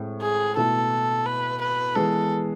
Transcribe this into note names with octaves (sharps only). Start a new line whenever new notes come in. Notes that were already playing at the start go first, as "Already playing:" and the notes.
Already playing: A2 G#3 C4
G#4
B2 A3 E4 A4
B4
B4
E3 G#3 B3 A4